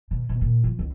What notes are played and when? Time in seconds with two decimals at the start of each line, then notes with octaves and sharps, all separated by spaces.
0.11 B2
0.29 B2
0.41 A#2
0.64 F3
0.79 C#2